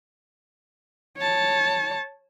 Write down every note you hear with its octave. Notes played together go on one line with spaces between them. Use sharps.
C#5 A5